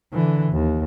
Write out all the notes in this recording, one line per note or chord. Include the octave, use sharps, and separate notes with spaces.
D3 E3
D#2